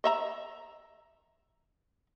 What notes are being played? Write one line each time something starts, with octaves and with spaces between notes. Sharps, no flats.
D#5 E5 A#5